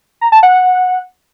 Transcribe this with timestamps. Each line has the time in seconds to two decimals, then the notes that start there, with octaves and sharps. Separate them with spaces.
0.21 A#5
0.32 A5
0.43 F#5